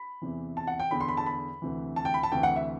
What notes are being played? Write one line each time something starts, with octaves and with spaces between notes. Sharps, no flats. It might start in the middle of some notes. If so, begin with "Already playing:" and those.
Already playing: B5
E2 C3 E3
A5
F#5
G5
E2 D3 B5
C6
B5
A5
B5
D2 C3 E3
A5
G5
B5
A5
D2 C3 E3 G5
F#5
E5